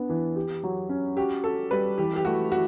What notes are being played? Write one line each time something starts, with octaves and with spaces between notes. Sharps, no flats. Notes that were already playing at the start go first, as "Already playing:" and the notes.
Already playing: B3 D4
E3
G4
F#3
C#4
F#4 G4
F#4 A4
G3 B4
E3 G4
G4
A3 F#4
E4 F#4